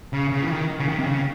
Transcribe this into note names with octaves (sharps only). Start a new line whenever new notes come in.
C#3
C#3
E3
D#3
C#3
D#3
C3
C#3